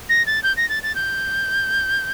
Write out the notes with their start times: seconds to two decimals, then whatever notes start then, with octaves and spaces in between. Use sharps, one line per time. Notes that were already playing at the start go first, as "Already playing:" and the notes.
0.09 A#6
0.26 A6
0.43 G6
0.57 A#6
0.69 A6
0.83 A6
0.95 G6